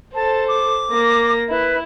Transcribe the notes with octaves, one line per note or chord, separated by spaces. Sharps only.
A4 C5 A5
D6
A#3 A#6
E4 B4